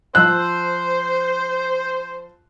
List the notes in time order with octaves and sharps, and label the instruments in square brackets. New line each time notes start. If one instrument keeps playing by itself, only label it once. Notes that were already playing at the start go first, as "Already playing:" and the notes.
[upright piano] F3 E6 F#6 [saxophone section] C5